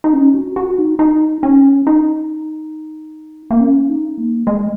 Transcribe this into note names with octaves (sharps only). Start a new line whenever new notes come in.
D#4
C#4
F#4
F#4
D#4
D#4
C#4
D#4
A#3
C#4
D#4
A#3
G#3